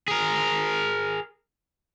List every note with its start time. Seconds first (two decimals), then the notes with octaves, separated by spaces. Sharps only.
0.08 G#4 A#4